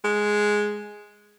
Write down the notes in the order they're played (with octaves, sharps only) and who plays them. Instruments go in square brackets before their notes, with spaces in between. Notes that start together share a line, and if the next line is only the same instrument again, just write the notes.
[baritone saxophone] G#3